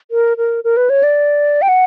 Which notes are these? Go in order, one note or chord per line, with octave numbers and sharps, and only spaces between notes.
A#4
A#4
A#4
B4
C#5
D5
G5
F#5